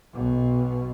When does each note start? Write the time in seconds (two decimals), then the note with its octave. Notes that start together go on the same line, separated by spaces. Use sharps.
0.14 B1 B2